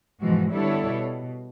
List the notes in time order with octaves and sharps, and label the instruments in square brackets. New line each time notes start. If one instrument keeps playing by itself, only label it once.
[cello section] G#2 B2 E3 F3 G#3 F#4
D3 G3 B3 E4 A4 C#5
B2